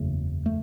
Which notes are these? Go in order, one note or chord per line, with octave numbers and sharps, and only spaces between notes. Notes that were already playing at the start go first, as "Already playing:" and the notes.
Already playing: F#1 E2 C#3 A3
A3